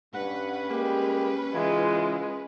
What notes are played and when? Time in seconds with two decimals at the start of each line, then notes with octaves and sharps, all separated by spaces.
0.15 G2 C#4 B4 F#5
0.70 G3 G#3 A#3 G4
1.54 G#2 C#3 E3 G#3 F4